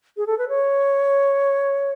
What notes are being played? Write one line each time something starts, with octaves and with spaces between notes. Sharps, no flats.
G#4
A4
B4
C#5